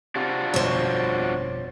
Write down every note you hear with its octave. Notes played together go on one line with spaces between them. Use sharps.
C3 D4 F4 F#4
G1 F2 B2 C5 C#5